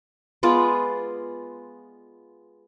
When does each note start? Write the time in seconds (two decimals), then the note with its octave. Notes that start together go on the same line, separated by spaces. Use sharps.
0.43 G#3 B3 F4 D5